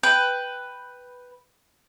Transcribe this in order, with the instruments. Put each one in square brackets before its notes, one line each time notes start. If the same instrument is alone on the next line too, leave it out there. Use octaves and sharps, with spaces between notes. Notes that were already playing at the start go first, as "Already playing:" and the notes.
[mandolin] B4 G5